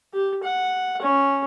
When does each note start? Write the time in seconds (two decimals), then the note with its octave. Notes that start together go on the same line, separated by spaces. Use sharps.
0.14 G4
0.43 F#5
1.02 C#4